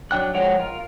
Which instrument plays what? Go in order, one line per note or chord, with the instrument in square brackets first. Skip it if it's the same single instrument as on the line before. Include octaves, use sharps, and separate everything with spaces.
[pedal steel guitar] F#3 D4 G5 F#6
F3 G#3 C#5 F#5 G5
F4 A#4